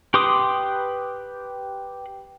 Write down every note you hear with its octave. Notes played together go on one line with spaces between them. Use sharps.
G4 B4 C6 D6 D#6